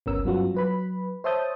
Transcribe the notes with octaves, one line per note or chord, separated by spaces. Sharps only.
G1 C#2 B3 C#4 A#4 E6
G2 F#3 B3 C#4 F4 F#4
F#3 B4 B5
C5 C#5 E5 A5 D#6 G6